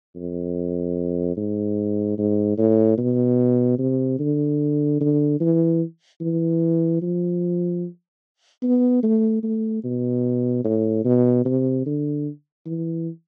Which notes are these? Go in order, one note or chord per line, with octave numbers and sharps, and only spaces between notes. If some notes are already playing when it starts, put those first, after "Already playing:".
F2
G#2
G#2
A2
B2
C3
D3
D3
E3
E3
F3
B3
A3
A3
B2
A2
B2
C3
D3
E3